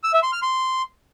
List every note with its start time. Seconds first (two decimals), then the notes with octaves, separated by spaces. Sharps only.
0.04 E6
0.13 E5
0.23 C6
0.32 F6
0.42 C6